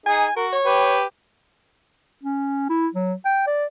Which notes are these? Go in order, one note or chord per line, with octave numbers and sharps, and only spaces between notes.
D#4 G#4 G#5
F#4 A#4
C#5
G4 B4
C#4
E4
F#3
G5
D5